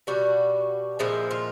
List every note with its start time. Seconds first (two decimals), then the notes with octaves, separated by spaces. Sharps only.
0.07 B2 G3 F#4
0.99 A#2 F3 G#3 E4
1.31 F4